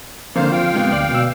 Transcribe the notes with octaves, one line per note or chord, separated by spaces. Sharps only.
F2 D3 A#3 C5 F5
F4 F5 G5
G#2 C3 B3
D2 D5
B2 E6